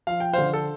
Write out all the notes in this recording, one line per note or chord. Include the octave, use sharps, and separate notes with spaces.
F3 F5
G5
D3 C5 F5
A4